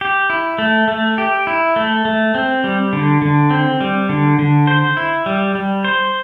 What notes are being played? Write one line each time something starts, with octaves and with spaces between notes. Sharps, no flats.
G4
E4
A3
A3
G4
E4
A3
A3
C4
G3
D3
D3
C4
G3
D3
D3
C5
E4
G3
G3
C5